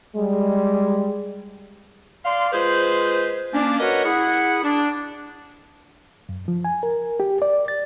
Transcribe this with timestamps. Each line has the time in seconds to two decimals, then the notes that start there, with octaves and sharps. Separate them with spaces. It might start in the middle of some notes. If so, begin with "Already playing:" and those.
0.16 G3 G#3
2.25 D5 F5 C6
2.53 G#3 F4 G#4 B4 C5
3.54 A#3 C#4 D4
3.80 F#4 A#4 B4 C#5 D#5 F#5
4.05 E4 G#4 F#5
4.64 D4
6.29 F#2
6.48 F3
6.65 G#5
6.83 A#4
7.20 G4
7.42 D5
7.68 A6